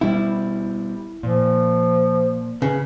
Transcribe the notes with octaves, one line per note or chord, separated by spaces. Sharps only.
B2 G3 E4
A#2 F3
C#3 B4